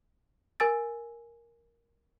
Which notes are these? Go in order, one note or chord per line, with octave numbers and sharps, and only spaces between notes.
A#4 G#5 E6 A6